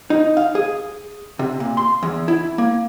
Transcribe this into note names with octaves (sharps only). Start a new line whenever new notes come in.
D#4
F5
G#4
C3
A#2
C6
E2
E4
A#3